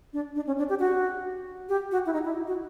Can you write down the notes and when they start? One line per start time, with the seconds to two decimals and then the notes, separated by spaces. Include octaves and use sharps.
0.13 D4
0.36 D4
0.47 C#4
0.58 D4
0.69 G4
0.80 F#4
1.69 G4
1.91 F#4
2.06 E4
2.13 D#4
2.24 E4
2.47 F#4